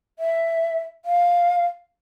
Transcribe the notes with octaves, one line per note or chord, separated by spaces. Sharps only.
E5
F5